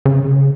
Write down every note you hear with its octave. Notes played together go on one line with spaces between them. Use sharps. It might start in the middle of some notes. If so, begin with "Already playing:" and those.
C#3